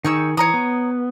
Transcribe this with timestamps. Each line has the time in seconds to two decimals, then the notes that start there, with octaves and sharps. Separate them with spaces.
0.05 D#3 D#4 G#4 C#5 E6
0.37 E3 C#5 A#5 D#6
0.54 B3